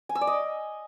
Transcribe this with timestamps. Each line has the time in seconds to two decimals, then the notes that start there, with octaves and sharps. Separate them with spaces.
0.09 G#5
0.15 E6
0.21 D5
0.27 D#5